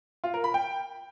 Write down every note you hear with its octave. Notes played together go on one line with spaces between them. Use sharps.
F4
A#4
B5
G5